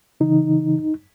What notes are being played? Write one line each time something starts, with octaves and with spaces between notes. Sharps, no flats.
C#3 E3 D#4